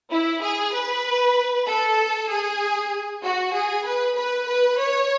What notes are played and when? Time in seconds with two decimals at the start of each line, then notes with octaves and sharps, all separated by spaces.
0.11 E4
0.42 G#4
0.74 B4
1.67 A4
2.30 G#4
3.23 F#4
3.54 G#4
3.85 B4
4.16 B4
4.47 B4
4.78 C#5